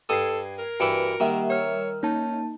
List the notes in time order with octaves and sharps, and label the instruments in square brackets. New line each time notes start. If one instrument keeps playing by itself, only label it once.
[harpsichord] G2 D#6 [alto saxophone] A4 [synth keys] G#6 C7
[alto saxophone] A#4
[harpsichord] G2 E3 E4 [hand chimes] F#4 C#7 D7
[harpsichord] D#3 [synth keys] G3 E5 E7 [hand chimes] A#3 G4 F#5
[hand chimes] A#4 F6 [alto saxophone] C#5
[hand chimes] A#3 A5 [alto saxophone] C#4 [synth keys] D#4